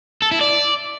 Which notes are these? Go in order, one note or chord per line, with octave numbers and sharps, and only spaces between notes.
A4
E4
D5